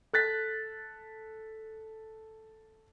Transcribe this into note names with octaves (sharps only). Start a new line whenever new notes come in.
A4 F#6 A6 B6